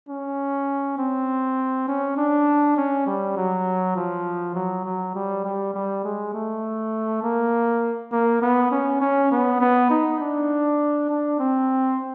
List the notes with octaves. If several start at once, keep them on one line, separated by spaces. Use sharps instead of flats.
C#4
C4
C#4
D4
C#4
G3
F#3
F3
F#3
F#3
G3
G3
G3
G#3
A3
A#3
A#3
B3
C#4
C#4
B3
B3
D#4
D4
D4
C4